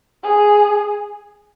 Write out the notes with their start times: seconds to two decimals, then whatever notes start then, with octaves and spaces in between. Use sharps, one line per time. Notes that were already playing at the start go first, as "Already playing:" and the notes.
0.23 G#4